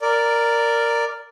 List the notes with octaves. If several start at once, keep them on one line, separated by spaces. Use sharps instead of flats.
A#4 D5